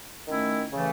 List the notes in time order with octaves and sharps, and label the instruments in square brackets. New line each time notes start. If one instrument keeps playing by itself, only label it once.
[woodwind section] D#3 A3 C#4 E4
C#3 E3 A3